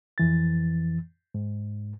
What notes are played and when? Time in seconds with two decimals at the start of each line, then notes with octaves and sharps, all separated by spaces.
0.18 F2 E3 A6
1.35 G#2